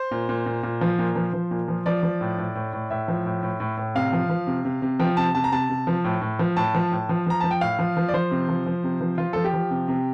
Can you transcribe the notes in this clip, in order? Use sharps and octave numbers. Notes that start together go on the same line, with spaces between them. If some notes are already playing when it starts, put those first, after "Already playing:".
Already playing: C5
A#2
A#2
A#2
A#2
F3
A#2
F3
F3
A#2
F3
F3 D5
F3
A2
A2
A2
A2
A2 E5
F3
A2
A2
A2
A2
C3 F5
F3
F3
C3
C3
C3
F3 G5
C3 A5
C3 A5
A#5
C3 A5
C3
F3
A2
A2
F3
A2 A5
F3
A2
F3
F3 A#5
F3 A5
G5
A2 F5
F3
F3
D5
F3 C5
C3
F3
F3
C3
F3
F3 F4
F3 A4
G4
F3
C3
C3